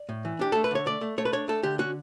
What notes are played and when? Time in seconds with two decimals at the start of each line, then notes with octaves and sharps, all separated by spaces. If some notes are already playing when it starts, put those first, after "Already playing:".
Already playing: D5
0.09 A2
0.25 E3
0.39 D4 G4
0.52 A3 A4
0.64 B4
0.71 D3 C#5
0.86 A3 D5
1.01 A3
1.18 A3 C#5
1.25 B4
1.33 D4 C#5
1.48 A3 A4
1.63 D3 G4
1.79 C#4 F#4